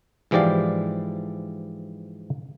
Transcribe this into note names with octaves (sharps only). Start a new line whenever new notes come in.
G#2 E3 F3 G4 D5 F5